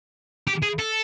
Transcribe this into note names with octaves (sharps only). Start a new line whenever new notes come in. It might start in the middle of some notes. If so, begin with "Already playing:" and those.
G4
G#4
A4